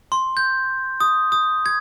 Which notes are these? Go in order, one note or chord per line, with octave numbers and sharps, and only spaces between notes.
C6
G6
D#6
D#6
G#6